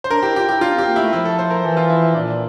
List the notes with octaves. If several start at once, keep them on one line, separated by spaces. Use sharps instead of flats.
C5
D4 A#4
E4 G4
F4 G4
E4 G4
D4 F4
C4 G4
A#3
A3 E4
F3 E4
A4
C5
A#4
E3 A4
F4
E4
E4
A#2 D4